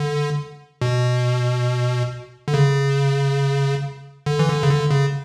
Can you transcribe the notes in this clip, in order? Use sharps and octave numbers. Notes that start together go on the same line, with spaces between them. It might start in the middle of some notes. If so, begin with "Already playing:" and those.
Already playing: D3
B2
D3
C#3
D3
E3
D3
C#3
D3
C#3